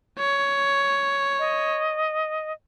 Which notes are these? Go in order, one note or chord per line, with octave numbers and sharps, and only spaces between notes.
C#5
D#5